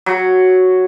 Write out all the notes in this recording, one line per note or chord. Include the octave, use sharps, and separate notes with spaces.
F#3